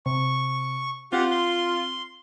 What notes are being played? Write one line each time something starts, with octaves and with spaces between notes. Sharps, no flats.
C3 C#6
C4 F4 G4 F#5
C6